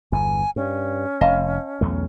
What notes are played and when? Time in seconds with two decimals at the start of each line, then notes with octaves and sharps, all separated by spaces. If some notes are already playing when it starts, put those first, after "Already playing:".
0.12 G1 E2 G#5
0.56 G2 C#4
1.21 F1 D#5 F5 A5
1.81 B1 E2 A3